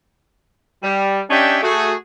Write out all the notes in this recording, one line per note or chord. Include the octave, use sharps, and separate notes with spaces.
G3
C#4 D4 G4 D#5 E5 G5
A3 F#4 G#4